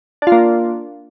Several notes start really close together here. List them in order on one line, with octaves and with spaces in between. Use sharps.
D4 F4 A#3